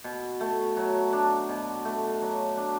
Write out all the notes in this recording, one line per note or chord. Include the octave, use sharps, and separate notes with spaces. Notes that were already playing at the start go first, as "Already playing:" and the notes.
B2
A3
F#3
D4
B2
A3
F#3
D4